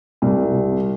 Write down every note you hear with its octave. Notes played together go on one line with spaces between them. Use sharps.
C2